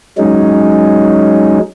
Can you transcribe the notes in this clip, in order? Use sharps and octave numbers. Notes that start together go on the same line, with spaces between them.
F#3 G#3 C#4 D#4